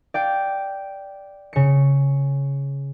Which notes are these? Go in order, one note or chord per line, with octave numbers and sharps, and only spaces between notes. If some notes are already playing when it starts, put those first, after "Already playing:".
D5 F5 G5
C#3 C#7